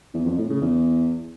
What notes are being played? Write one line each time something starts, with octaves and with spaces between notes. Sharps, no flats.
E2
F2
A2
C#3
E2